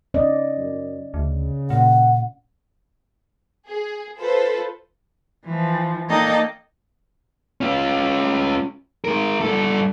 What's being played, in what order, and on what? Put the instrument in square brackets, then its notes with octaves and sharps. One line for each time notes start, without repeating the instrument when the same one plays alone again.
[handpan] C#4 D5 D#5
[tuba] F#2
[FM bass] D2 [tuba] C#3
[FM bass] A#2 [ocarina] F#5
[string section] G#4
F4 A4 B4 C5
[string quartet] E3 F3
A#3 D#4 A4 D5 D#5 G5
[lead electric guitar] C#4 F4
G#3 A#4
G2 A4